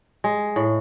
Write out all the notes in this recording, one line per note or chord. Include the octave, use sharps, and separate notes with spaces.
G#3
A2